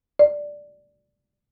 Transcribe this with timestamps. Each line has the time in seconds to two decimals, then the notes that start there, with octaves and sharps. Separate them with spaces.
0.19 D5